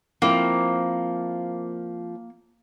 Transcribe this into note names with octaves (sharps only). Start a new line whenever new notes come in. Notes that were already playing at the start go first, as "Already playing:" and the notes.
F3 A#3 C4 E4